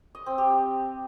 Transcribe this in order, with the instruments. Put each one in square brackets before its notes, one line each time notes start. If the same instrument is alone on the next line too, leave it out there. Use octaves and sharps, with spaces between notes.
[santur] D#5
C4
G4